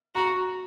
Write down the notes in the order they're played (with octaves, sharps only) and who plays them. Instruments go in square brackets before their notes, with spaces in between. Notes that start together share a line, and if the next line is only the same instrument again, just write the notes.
[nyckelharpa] F#4 [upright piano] A#5